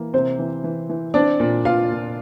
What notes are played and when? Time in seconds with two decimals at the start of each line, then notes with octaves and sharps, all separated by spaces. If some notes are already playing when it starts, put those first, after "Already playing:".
Already playing: E3 A#3
0.14 C3 C4 C5
0.39 E3
0.64 E3
0.90 E3
1.14 C4 D4 D5
1.40 A#2
1.65 A#2 F4 F5
1.90 A#2